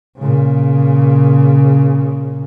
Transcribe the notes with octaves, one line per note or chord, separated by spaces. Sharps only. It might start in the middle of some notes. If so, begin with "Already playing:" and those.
A#2 C#3